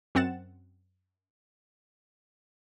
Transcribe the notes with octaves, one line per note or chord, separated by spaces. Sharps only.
F#2 C4 F#5 A6 E7